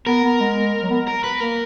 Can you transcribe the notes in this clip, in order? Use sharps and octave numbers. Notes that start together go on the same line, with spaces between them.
B3 A#4
B3
G#3
F#3
B3
A#4
B4
A#3 A#4